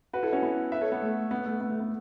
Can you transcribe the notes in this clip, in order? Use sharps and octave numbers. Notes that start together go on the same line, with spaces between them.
F#4 B4
E4 A4
C#4 F#4
B3 E4
B4 E5
A4 C#5
B3
A3
B3
A3
B3
A3
B3